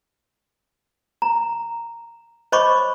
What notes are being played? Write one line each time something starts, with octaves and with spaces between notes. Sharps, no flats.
A#5
C5 C#5 D#5 B5 C#6 D6